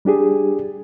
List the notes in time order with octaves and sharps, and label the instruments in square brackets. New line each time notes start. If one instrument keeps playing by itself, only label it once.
[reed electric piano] G3 D4 G4 G#4